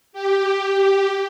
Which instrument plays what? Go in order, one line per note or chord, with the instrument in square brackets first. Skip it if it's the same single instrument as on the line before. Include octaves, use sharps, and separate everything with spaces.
[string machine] G4